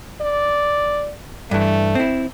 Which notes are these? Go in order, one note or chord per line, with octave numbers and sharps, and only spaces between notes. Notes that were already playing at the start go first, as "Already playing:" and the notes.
D5
G2 E3 A3
C4 E4